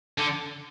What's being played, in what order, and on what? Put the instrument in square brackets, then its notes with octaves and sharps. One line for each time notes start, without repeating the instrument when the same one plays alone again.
[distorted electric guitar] D3